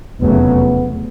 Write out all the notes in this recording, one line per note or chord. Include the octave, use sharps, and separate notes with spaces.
F1 E2 C#3 F#3 A3 B3